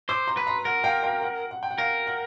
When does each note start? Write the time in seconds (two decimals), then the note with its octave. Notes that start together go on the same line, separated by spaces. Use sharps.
0.09 C5 D6 E6
0.27 A#5 C6
0.37 B4
0.47 A#5 C6
0.65 A#4 F#5
0.84 F5 G5
1.03 F5 G5
1.22 F#5
1.51 F#5
1.63 G5
1.71 F#5
1.78 A#4 F5
2.07 F#5